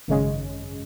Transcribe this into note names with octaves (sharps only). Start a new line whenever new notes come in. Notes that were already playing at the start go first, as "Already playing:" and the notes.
G#1 F#2 C#3 G#3 C#4